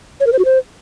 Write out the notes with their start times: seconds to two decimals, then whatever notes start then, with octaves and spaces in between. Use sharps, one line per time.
0.20 C#5
0.26 A#4
0.32 C5
0.39 F#4
0.45 C5